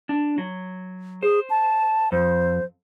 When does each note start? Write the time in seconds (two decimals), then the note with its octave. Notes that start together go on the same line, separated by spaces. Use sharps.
0.09 D4
0.38 F#3
1.23 G#4 C5
1.50 A5
2.12 F2 C5